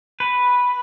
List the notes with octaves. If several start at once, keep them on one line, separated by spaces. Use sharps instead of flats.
B4